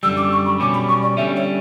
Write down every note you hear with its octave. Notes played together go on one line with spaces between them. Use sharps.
F#2 D3 G3 E6
D6
C#6
B5
B2 G3 C#4 D6
B5
C#6
D5
D3 G3 C#4 E5
C#5